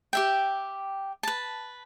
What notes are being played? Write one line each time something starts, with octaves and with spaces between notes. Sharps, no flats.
G4 E5 G5
B4 A5